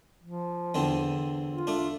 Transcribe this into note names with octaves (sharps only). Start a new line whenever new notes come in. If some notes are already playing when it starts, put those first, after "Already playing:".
F3
E2 D3 C4
F4
A3 D4